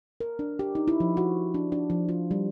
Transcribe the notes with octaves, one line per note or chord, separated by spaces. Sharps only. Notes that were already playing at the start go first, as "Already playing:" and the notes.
A#4
D4
G4
D#4
E4
F3
F#4
D4
D4
F3
F4
G3